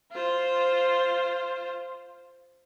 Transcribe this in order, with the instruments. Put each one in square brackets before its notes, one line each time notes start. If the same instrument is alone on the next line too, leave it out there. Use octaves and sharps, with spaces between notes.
[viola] F4 C5